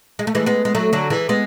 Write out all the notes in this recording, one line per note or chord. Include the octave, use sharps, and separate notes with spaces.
G#3
A3
E3 G#3
G#3 B3
G#3
F#3 A3
D3 F#3
E3 G#3
G#3 B3